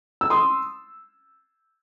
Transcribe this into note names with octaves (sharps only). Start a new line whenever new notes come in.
E6
C6 D#6